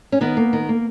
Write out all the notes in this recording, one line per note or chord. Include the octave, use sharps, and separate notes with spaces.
C#4
D#3 B3
A#3
D#3
A#3